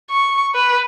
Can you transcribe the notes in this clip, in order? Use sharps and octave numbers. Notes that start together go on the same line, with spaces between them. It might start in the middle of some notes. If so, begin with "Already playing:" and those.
C#6
B4